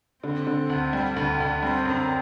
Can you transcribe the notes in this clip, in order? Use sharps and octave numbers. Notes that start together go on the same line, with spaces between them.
D3 C4
D3
D2
G3
D2
D2
G3 C4
F#2